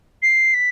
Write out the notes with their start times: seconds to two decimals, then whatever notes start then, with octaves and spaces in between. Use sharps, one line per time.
0.22 C7
0.54 B6